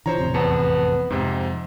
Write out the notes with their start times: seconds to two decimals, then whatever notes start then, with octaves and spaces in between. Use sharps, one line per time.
0.06 D3 E3 F3 C5 C#5 A#5
0.18 A1 F2 C3
0.34 E2 B3 A5 C#7
1.10 F2 G#2 C3